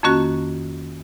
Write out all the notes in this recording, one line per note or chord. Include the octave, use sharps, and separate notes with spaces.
F2 D#3 A#3 C#4 F#4